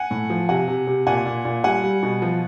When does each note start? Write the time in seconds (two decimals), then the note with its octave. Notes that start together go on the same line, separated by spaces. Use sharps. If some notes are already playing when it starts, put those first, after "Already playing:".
Already playing: F#5 G#5
0.11 A2
0.30 F3
0.49 C3 F#5 G#5
0.68 C3
0.87 C3
1.07 A#2 F#5 G#5
1.26 A#2
1.45 A#2
1.64 G3 F#5 G#5
1.84 G3
2.03 B2
2.22 F3